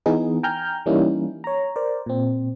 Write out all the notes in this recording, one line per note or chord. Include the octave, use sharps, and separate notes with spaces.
E3 B3 D#4 G#4
G5 G#5 A#5 F6 G6
E3 G3 A#3 C#4 D#4 E4
C#5 A#5
A#4 C5 D5
A#2 C4